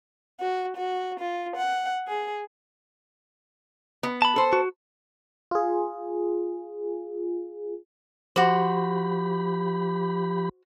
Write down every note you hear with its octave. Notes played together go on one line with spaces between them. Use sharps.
F#4
F#4
F4
F#5
G#4
B3
A5 B5
A4 C5
F#4
F4 G#4
F3 F#4 G4 C5 B5